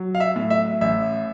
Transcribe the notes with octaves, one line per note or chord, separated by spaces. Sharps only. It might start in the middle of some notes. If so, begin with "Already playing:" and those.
Already playing: F#3
F5
E5
A2
E5
A1 E5